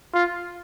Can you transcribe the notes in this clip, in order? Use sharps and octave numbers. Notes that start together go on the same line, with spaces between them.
F4